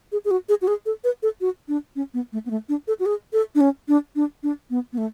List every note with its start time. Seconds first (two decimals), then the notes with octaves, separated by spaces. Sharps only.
0.12 G#4
0.25 G#4
0.31 F#4
0.49 G#4
0.62 F#4
0.68 G#4
0.86 A4
1.04 B4
1.23 A4
1.41 F#4
1.68 D4
1.96 C#4
2.14 B3
2.32 A3
2.46 B3
2.51 A3
2.69 D4
2.88 A4
3.00 F#4
3.06 G#4
3.33 A4
3.55 D4
3.61 C#4
3.88 D4
4.16 D4
4.43 D4
4.70 B3
4.93 B3
4.98 A3